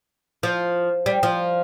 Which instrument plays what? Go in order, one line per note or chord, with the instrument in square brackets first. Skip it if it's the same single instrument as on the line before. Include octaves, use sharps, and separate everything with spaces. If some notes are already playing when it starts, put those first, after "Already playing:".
[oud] F3
G3
F3